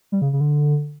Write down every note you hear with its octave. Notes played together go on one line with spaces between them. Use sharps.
G3
C#3
C#3
D3